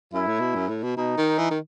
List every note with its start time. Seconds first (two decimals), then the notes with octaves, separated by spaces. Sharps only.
0.13 F#2 E4
0.27 A2
0.40 B2
0.55 F#2
0.69 A2
0.83 B2
0.96 B2 D#4
1.17 D#3
1.38 E3
1.50 D#3